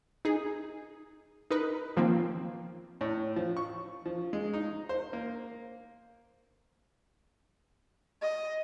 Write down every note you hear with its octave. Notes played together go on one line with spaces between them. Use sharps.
D#4 G#4
D#4 A#4 B4
D#3 F3 A#3 C4
A2
F3
C#6
F3
G#3
D#4
C5
A#3
D#5